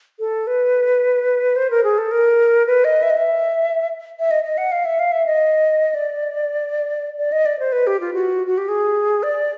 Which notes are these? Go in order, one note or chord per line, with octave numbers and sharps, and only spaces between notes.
A4
B4
C5
A#4
G#4
A4
A#4
B4
D#5
E5
D#5
E5
E5
D#5
D#5
F#5
F5
E5
F5
E5
D#5
D5
D5
D#5
D5
C5
B4
G4
F4
F#4
F#4
G4
G#4
D5